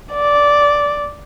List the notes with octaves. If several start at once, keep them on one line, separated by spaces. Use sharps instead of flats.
D5